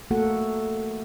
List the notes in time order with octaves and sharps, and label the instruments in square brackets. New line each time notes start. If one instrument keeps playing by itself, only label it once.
[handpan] A3 A#3 F#4 A4 F#5